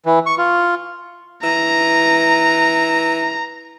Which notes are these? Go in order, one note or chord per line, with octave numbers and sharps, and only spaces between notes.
E3
C#6
F4
E3 A#5